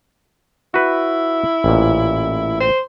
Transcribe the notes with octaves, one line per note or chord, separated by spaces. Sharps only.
E4 F#4 B4 E5
A1 A#2
C5